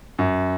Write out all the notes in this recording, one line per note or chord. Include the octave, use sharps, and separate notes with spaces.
F#2